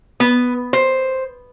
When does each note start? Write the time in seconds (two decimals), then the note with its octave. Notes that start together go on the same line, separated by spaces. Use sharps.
0.20 B3
0.73 C5